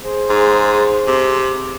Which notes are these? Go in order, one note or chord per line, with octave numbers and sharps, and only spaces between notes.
G#4 C5
G#2
C3